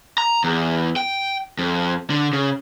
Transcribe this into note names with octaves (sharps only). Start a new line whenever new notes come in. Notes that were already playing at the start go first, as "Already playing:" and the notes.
A#5
E2
G5
F2
D3
C#3